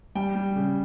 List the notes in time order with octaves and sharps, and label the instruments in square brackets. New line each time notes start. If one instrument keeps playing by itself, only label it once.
[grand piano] G3 G5
G3
C#3